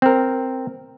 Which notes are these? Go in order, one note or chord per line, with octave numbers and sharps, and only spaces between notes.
C4 A#4